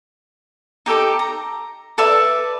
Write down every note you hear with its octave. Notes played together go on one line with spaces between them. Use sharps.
D#4 G4 A4 D6
A#5
A4 B4 D5 E5